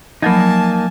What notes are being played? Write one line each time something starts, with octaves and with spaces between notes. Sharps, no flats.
F3 F#3 A#3 D#4 G#5 A5 B5